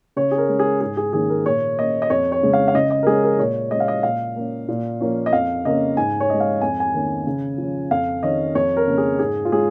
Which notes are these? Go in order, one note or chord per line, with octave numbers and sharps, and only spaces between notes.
C#3 C#5
G#4
A#4
G#3 C#4
G#4
G#2 G#4
G#4
D#3 A#3 C#4 G#4
A#4
A#2 C#5
A#3 C#4 D#5
D#5
F2 C#5
C#5
C#3 G#3 C#4
F5
F5
C#3 D#5
D#5
A#4
G#3 C#4 G#4
A#4
A#2 C#5
G#3 C#4 D#5
F5
D#5
A#2 F5
A#3 C#4
A#2
F3 A#3 C#4
D#5
F2 F5
C#3 A#3 C#4 D#5
G#2 G#5
C#5
G#3 C#4 D#5
F5
F2 G#5
G#5
D#3 A#3 C#4
C#3
F3 C#4
F2 F5
D#3 C#4 D#5
F2 C#5
A#4
C#3 A#3 C#4
G#4
G#2 G#4
F4
G#3 C#4 G#4